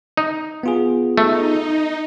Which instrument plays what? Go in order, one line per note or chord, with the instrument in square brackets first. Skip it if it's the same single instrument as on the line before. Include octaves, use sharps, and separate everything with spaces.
[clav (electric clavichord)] D#4
[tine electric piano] B3 F4 G#4
[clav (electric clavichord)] A3 [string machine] D#4